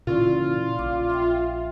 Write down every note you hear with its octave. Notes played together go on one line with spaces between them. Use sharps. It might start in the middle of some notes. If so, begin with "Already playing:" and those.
A#2 C#3 E3 C#4 E4 F4 D5
A#1 D6
E5 G5